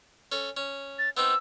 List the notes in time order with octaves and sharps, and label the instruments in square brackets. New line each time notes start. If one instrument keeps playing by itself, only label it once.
[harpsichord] C#4 A4
C#4
[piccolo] A6
[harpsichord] B3 C4 D#4 [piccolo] E6